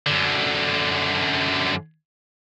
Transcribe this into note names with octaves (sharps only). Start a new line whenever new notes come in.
F#2 D3